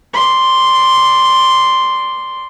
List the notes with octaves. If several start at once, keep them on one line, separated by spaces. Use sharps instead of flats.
D5 C6